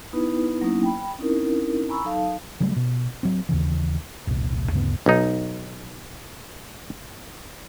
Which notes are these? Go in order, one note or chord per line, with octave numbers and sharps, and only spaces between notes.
B3 D#4 E4 B4
F#3 A#3 B3 C#4 D#4 E4
G5 B5
C4 C#4 D#4 E4 A#4
G#5 A#5 B5 C#6 E6
F#3 D#4 A4 F5 A5
C#3 F#3 G3 A3
B2
F#3 C4
D#2 C#3 E3
E1 C2 A#2
D2 G2 C#3 B3
B1 D#4